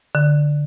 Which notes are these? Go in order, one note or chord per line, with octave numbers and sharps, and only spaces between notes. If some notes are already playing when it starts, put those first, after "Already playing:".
D3